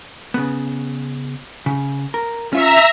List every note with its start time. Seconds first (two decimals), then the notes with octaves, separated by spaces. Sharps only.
0.34 C#3 B3
1.66 C#3
2.14 A#4
2.53 C#4 F4 C#5 E5 A#5